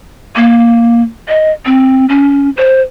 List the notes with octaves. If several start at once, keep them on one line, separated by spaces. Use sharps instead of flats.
A#3
D#5
C4
C#4
C5